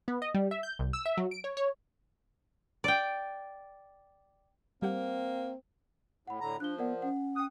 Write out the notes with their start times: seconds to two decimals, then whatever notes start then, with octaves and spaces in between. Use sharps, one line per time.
0.08 B3
0.22 D#5
0.34 G3
0.51 E5
0.63 G6
0.79 C2
0.93 E6
1.06 E5
1.17 F#3
1.31 D7
1.44 C#5
1.57 C#5
2.84 D5 G5
4.82 G3 A#3 C4 G4 F#5
6.27 A2 F#5 B5
6.41 A2 D3 A#5
6.60 F3 D4 F#6 G7
6.78 B3 A#4 D5 F#5
7.02 C#4 F#5
7.36 G5 D#6 F#6